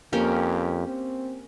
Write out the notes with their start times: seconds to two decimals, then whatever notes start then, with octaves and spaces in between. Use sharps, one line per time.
0.13 F2 A#3 C#4 G4
0.87 C4